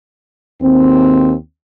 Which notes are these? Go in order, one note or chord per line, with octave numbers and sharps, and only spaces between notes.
D#2 C4